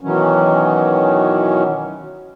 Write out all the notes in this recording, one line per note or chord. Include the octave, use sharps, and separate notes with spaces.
B2 D#3 E3 F#3 C#4